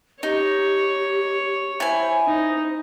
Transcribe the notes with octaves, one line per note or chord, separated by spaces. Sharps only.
D#4 G4 C#5
E4 C5 G#5
D#4 C5